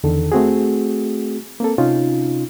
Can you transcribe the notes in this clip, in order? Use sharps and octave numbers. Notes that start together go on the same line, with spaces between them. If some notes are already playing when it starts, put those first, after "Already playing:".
E2 D3 D#3 A4
A3 C4 F#4 G#4
A#3 C4 A4
C3 C#4 D#4 F4